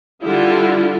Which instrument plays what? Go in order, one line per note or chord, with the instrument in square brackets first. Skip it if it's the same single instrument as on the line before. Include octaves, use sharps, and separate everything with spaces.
[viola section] D3 G3 E4 F4